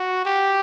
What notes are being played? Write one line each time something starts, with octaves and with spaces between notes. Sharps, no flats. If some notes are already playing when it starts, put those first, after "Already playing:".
Already playing: F#4
G4